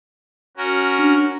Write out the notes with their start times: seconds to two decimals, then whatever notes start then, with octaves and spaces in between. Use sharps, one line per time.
0.57 C#4 F#4 A#4
0.99 D4